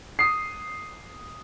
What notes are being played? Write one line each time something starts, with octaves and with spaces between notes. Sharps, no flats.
D#6 C7